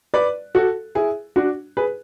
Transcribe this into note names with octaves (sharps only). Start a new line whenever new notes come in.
B4 D5
F#4 A4
E4 G#4
D4 F#4
G#4 B4